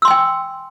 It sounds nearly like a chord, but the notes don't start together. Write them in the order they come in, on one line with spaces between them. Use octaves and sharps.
E6 C6 G#5 G5